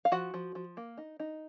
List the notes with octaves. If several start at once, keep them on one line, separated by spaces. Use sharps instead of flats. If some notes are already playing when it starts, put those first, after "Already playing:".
F5
F3 F#4 F#5
F3
F3
A#3
D#4
D#4